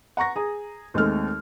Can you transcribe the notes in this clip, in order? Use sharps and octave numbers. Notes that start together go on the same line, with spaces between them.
F#5 A#5 C#6 A#6
G#4 A#5
D#2 G#3 A3 C4 A4 F6